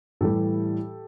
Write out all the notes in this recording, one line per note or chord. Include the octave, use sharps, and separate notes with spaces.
A2 E3 G3 G4 A4